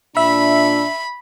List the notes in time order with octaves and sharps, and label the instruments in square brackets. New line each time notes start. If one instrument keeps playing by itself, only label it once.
[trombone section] A#2 D4 [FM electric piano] E5 [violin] B5